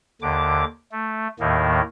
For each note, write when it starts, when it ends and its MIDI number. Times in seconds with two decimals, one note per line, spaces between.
0.22 0.64 39
0.22 0.64 50
0.22 0.64 86
0.92 1.28 57
1.40 1.81 39
1.40 1.81 45
1.40 1.81 51
1.40 1.81 58